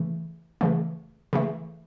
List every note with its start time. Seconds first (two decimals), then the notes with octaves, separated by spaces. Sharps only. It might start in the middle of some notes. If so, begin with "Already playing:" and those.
Already playing: C#3 E3 A3
0.61 C#3 E3 A3
1.33 C#3 E3 A3